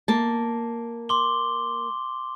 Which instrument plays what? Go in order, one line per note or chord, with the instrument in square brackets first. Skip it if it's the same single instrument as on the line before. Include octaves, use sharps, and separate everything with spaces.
[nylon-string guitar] A#3 A5
[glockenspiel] C6 D6 G7